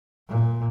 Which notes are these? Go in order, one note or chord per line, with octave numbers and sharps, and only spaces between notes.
A#2